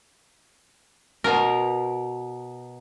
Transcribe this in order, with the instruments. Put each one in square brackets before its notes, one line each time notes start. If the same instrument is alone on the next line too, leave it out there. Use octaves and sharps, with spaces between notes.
[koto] B2 A#4